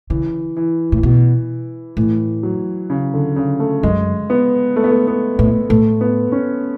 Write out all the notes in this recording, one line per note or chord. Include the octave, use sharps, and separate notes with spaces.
C#3 E3
E3
A2
B2
A2 E3
F#3
C#3
D3
C#3
A3
F#2 G#3
B3
A3
B3
A3
B3
A2 B3
A2 A3
B3
C#4